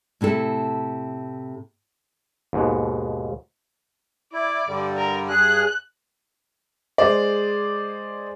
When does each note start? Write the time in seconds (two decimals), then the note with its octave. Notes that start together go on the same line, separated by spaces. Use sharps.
0.21 A2 C3 E4 A4
2.53 D#2 G#2 B2
4.33 E4 D5
4.67 G2 D3 G3
4.97 A#4
5.29 G2 G#4 F#6
6.98 G#3 G#4 C5 D5